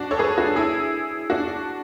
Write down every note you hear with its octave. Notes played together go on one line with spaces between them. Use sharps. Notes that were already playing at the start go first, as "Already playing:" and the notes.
Already playing: D4 F#4
A4 C#5
G#4 B4
F#4 A4
E4 G#4
D4 F#4